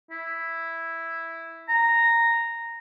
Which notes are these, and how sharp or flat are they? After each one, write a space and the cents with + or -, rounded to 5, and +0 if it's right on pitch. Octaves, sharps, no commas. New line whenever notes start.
E4 +0
A#5 -5